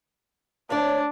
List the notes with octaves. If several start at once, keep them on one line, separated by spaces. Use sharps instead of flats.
D2 D4 C#5 D5